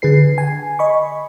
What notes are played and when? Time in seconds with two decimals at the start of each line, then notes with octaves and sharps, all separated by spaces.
0.02 D3 G#4 B4 C7
0.38 G#5
0.79 D#5 B5 C#6